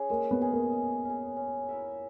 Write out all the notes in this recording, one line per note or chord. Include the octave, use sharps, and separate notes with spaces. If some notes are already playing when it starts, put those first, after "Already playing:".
Already playing: C#4 G#4
G#3 A#3
B3
C#4 G#4
A#3
G#3
C#4 G#4
C#4
E4 A#4 E5